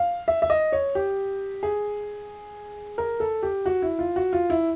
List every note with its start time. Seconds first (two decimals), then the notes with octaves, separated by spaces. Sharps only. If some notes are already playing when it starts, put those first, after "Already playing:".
Already playing: F5
0.28 E5
0.42 E5
0.50 D#5
0.72 C#5
0.95 G4
1.63 G#4
2.98 A#4
3.20 A4
3.43 G4
3.66 F#4
3.82 E4
3.99 F4
4.16 F#4
4.33 F4
4.50 E4